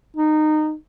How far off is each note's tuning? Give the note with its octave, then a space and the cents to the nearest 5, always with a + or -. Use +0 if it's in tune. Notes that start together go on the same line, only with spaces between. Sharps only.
D#4 -20